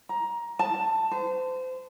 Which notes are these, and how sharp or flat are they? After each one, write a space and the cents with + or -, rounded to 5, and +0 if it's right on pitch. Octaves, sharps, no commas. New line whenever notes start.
A#5 +15
A5 +10
C5 -30